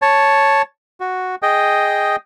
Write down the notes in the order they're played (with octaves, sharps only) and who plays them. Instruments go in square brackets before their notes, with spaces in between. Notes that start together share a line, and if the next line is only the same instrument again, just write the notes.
[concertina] C#5 A5
F#4
G#4 D#5 G5